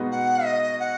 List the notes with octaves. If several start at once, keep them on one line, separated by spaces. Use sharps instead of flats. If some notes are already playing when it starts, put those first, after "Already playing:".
Already playing: B2 G#3 B3 D#4 F#4
F#5
D#5
F#5